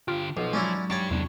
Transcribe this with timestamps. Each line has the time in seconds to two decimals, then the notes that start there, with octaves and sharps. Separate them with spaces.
0.08 D3 F4 G4
0.37 B1 F3
0.53 G#2 F#3 C#4 D4 E4
0.90 D4 G4 C#5 A5 C#6
1.10 E2 C3 D4